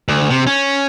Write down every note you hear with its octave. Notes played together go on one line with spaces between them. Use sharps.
D2
C3
C#4